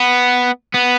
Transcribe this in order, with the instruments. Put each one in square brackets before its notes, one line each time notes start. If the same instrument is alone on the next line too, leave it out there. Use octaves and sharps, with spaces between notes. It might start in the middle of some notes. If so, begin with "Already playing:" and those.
Already playing: [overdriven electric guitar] B3
B3